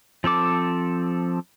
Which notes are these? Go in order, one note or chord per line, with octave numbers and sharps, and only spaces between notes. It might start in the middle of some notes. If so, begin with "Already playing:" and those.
F3 C4 A4 D6